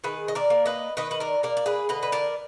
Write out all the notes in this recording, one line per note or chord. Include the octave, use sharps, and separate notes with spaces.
D#3 G#4 B4
D#5
A#4 D5
A#3
B4 D#5
D#3 B4 D#5
B4
A#4 D5
A#3 A#4 D5
D5
G#4 B4
D3 B4 D#5
B4
A#4 D5